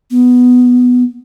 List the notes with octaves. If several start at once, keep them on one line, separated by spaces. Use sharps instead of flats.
B3